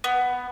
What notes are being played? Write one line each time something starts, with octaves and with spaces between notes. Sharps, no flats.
B3